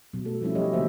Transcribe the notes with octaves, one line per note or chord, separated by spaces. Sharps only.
B2 F#3
A3 A4
F3 G3 C4 C#4 E4
F#3 C#4 G4 C#5 D#5
D3 E3 F#3 A#3 C5 E5